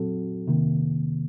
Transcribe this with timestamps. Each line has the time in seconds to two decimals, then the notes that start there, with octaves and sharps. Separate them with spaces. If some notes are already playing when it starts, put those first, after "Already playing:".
Already playing: A#2 F#3 C4 F#4 A4
0.47 C3 D#3 A#3